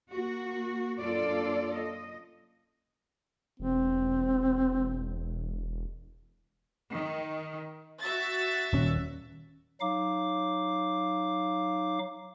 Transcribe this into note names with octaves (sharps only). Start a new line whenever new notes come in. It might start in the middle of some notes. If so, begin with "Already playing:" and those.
A#3 F#4
F#2 A#3 D4 F4 A4 D5
D#5
E1 C4
D#3
F#4 E5 A6
D#1 C#4
F#3 D#4 F5 D6